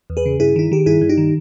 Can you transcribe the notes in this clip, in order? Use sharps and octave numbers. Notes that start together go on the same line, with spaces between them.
E2
G#4 B4
C#3
G2 E4 G#4
D#3 E4
D#3 G4
G2 E4 G#4
G2
D#4 G4
D#3